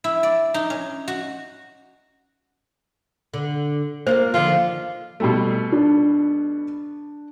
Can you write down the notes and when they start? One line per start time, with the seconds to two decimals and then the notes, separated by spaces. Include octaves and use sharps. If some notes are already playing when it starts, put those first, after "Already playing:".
0.04 E4
0.23 D5
0.54 D#4
0.70 C#4
1.08 F#4
3.34 D3
4.07 A#3 F4 A#4 C5
4.34 D3 D#3 F3 F4
5.20 B2 G3 A3
5.72 D4